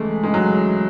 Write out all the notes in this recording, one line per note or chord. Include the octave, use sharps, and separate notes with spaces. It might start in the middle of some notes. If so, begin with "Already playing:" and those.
Already playing: C#2 C#3 E3 G#3 A3
C#2 C#3 E3 G#3
F#3